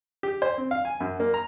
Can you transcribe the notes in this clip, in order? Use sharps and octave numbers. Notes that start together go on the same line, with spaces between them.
G4
C5
C4
F5
G#5
F#2
A#3
A#5